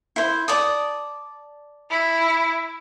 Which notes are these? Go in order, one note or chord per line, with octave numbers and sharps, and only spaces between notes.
E4 C5
D5 A5 D#6
E4